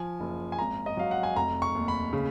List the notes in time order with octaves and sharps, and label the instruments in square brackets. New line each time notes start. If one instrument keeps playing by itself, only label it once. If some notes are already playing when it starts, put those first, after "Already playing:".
Already playing: [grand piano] F3 G#5
F#1
G#5
G#1 A#5
D#5
F#3 F5
F#5
G#5
F1 A#5
C#6
D#2
B5
C#3